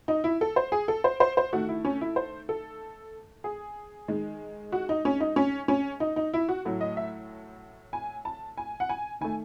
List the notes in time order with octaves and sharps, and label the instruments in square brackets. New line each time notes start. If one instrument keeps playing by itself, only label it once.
[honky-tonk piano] D#4
E4
A4
C5
G#4
A4
C5
C5
C5
D#3 A3 F#4
E4
C#4
E4
C5
A4
G#4
D#3 G#3
F#4
D#4
C#4
D#4
C#4
C#4
D#4
D#4
E4
F#4
A2 F#3 A3
D#5
E5
G#5
A5
G#5
F#5
G#5
D#3 A3 G#5